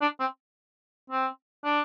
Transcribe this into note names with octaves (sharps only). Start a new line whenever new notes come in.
D4
C4
C4
D4